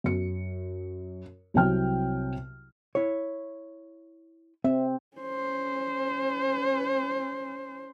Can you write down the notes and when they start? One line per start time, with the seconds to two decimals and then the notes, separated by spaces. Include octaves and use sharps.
0.04 F#2 C#7
1.54 C2 C3 F#3 G5 F6
2.95 E4 C#5
4.64 C4 E5
5.17 C#4 C5